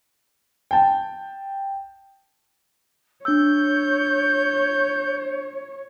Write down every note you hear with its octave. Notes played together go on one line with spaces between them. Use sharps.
G5 A5
D4 C#5 E6 G6